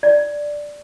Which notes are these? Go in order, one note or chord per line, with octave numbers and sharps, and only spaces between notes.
D5